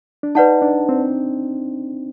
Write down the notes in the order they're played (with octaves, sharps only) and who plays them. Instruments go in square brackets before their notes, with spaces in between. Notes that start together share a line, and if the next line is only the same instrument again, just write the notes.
[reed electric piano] D4
[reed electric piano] D#4 [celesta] B4 D5 F#5 A5
[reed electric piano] D4
C4